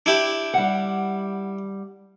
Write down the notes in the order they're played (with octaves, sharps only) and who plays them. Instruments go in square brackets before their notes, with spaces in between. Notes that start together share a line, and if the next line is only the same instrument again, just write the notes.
[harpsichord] D4 E4 G4
[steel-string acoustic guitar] G3 F#5